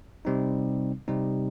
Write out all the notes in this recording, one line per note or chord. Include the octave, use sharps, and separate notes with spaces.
C3 G3 C4 D#4
C3 G3 C4 D#4